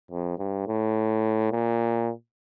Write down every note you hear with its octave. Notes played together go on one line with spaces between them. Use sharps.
F2
G2
A2
A#2